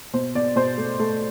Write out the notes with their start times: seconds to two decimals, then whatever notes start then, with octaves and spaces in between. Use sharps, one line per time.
0.13 B2 C5
0.35 B2 D5
0.56 B2 C5
0.78 A3
0.99 A3